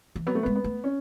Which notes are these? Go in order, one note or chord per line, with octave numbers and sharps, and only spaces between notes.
E3
F#3 B3
A3
G#3 B3
B3
A3
C#4